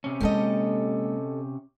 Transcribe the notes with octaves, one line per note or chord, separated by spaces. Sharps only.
C3 C#4
G#3 A#3 G4 A4 D#5